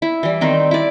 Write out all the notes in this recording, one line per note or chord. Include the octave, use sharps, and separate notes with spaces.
E4
E3 G3
D#3 C4 D#4
E4 D5